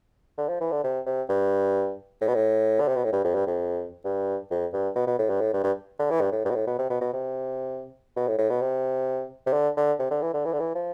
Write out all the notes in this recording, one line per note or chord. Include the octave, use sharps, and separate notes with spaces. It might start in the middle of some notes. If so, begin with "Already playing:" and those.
D3
F3
E3
D3
C3
C3
G2
A2
B2
A2
D3
C3
B2
A2
G2
F2
G2
F2
G2
F2
G2
B2
B2
A2
G2
A2
G2
G2
D3
E3
G2
A2
G2
B2
A2
B2
C3
B2
B2
C3
B2
A2
A2
B2
C3
C3
D3
D3
C3
D3
E3
D3
E3
D3
E3
F3